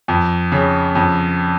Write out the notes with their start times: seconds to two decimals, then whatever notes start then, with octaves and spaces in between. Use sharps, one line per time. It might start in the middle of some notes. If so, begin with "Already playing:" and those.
0.08 F2
0.52 C#3
0.95 F2